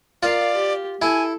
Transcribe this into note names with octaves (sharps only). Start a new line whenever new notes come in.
F4 A#4 D5 F5
G4
E4 A4 G#5